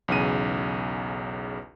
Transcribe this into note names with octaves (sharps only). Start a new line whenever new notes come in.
B1 E2 C#3 D#7